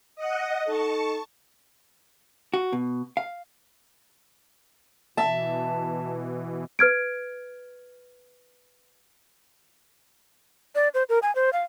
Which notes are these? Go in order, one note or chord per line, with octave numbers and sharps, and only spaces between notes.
D#5 F#5
D#4 A4 A5 C#6
F#4
B2
F5
B2 E3 E5 A5
B4 F6 G#6 D7
D5
C5
A#4
G#5
C5
F5